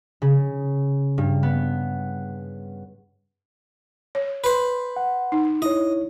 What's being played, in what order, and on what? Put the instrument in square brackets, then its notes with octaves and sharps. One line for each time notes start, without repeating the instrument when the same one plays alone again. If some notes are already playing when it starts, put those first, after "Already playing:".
[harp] C#3
G2
B3
[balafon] C#5
[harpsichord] B4 C5
[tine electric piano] F#5
[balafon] D#4
[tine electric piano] E4 C#5 [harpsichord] D#5